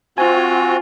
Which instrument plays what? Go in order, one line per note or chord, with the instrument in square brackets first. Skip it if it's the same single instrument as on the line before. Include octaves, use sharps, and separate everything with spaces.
[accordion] C4 F#4 [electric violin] F4 [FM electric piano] G#5